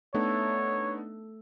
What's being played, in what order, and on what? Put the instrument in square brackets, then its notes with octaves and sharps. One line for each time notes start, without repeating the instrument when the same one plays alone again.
[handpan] A3 A4 [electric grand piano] B3 D4 D#4 [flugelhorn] C#5